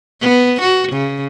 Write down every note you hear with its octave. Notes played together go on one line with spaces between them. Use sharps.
B3
F#4
C#3